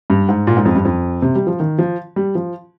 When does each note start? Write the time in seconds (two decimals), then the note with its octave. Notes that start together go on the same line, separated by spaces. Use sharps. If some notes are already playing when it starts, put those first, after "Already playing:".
0.10 G2
0.29 G#2
0.47 A#2
0.57 G#2
0.65 F2
0.75 G2
0.85 F2
1.22 C3
1.35 G3
1.47 F3
1.60 D#3
1.79 F3
2.16 G3
2.35 F3